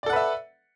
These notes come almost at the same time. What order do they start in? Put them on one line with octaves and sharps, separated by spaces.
D5 A4 F#5 B4 E5